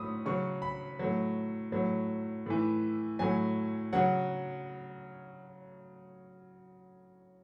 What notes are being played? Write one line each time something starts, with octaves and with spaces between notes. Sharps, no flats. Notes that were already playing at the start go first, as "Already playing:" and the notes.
Already playing: A2 F#3 B5 D#6
C#3 F#3 C#6
B5
A2 F#3
A2 F#3
A2 E3
A2 F#3 G#5
C#3 F#3 F#5